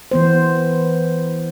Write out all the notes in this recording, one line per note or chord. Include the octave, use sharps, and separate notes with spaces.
E3 B3 C5